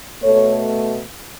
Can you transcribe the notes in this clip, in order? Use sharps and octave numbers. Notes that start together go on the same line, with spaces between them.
B2 A3 A4 C#5